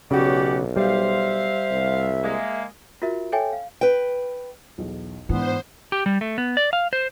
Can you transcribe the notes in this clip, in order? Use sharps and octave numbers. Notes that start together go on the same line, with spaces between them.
B1 C#3 C#4 F#4 G4 D5 F#5
G3 C5 E5 F5
C2
G#3 A#3
F4 F#4 A#4 E5
A4 C#5 E5 G5 G#5
F5
B4 G5
B1 E2 B2
G#2 E3 B3 D4 C5
G4
G3
A3
B3
D5
F5
C5